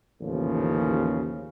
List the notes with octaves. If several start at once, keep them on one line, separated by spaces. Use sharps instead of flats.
A1 D#2 G#2 C#3 F3